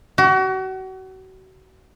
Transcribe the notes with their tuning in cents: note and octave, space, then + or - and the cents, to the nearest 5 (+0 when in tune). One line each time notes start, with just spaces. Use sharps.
F#4 +35